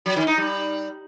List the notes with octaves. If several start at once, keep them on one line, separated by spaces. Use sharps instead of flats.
F#3
D#3
D#4
G3